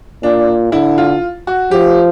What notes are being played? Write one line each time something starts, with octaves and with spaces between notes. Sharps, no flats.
A#2 D4
D3 E4
F4
F#4
F3 G4